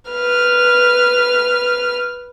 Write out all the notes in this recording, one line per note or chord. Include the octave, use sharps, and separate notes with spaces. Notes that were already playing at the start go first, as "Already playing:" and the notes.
B4 F6